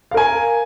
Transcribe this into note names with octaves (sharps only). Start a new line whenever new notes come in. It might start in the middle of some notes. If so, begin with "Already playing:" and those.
A#4 F5 G#5